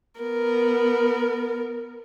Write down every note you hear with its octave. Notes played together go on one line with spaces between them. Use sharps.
B3 A#4